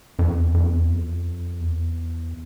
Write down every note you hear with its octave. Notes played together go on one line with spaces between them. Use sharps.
F2
E2
F2
E2
F2
E2